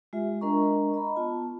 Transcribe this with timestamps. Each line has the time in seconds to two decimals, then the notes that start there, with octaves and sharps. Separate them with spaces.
0.13 G#3 F4 G4 E5
0.41 G#3 D4 A#4 D#5 A#5 C#6
0.94 D#5 A#5 B5
1.16 B3 F4 A5